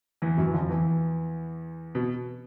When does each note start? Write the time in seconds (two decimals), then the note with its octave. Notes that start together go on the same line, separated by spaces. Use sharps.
0.22 E2 E3
0.38 F#2 F#3
0.47 E3
0.54 F2 F3
0.69 E2 E3
1.95 B2